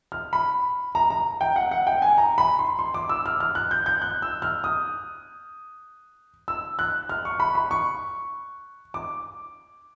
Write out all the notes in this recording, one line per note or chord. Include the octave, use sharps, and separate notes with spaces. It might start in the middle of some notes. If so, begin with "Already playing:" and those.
F6
B5
A#5
A#5
G5
F#5
F#5
G5
G#5
A#5
B5
C6
C6
D6
E6
F6
F6
F#6
G6
G6
F#6
E6
F6
D#6
E6
F#6
F6
C#6
B5
B5
C#6
D6